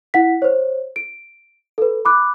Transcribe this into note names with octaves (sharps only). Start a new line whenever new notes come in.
E4 F#5 B6
C5 C#5
D7
A4 B4
B5 D6 F#6